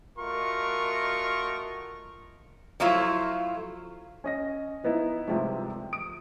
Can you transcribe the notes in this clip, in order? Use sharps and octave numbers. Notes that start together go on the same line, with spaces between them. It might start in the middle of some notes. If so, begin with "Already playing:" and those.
A3 F4 F#4 A#4 D#5 C#6
F3 F#3 A3 E4 F4
C#4 D#5 A#6
F3 B3 D#4 E4
G#2 C3 F3 G3 A3
D#6 D7